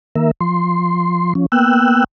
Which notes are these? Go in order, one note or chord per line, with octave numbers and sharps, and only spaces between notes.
D#3 A#3 A#4 E5
F3 C6
F3 C#4
A#3 B3 G5 E6 F#6